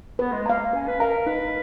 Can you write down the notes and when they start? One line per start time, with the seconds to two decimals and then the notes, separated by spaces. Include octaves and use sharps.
0.19 B3 B4
0.33 G#3
0.46 A#3 F5 A#5
0.73 C#4 B4
0.87 B4
1.00 A#4 F5 A#5
1.26 D#4 B4